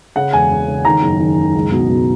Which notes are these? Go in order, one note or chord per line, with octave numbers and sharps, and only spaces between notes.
C#3 F#5
E1 G#5
E1
C#3
D#3 A#5
F#1
D#3
F#1
C#2
B2
B2